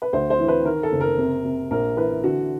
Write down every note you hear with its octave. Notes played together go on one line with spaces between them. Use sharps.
B4
D2 C5
C5
E3
B4
D#3 A#4
A4
F#1
A#4
C3
C3
A#1 A#4
E3 B4
D3 F#4